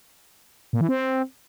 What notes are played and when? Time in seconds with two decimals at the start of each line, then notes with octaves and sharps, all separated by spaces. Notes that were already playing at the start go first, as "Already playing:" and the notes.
0.73 A#2
0.81 E3
0.89 C4